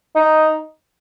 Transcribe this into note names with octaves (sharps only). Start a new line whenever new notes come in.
D#4